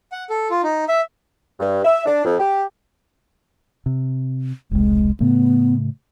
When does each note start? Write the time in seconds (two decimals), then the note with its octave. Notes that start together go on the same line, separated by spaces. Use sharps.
0.12 F#5
0.30 A4
0.50 F4
0.63 D#4
0.89 E5
1.60 G2
1.84 E5
2.06 D4
2.24 F2
2.39 G4
3.86 C3
4.71 E1 C2 G#3
5.20 A2 C#3 A3 B3